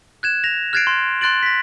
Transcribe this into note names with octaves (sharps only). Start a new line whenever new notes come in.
F#6 G#6 E7
A#6 F7
F6 F#6 G#6 A6 C7 D7
C6
C6 F#6 A6 D7 F#7
A#6 B6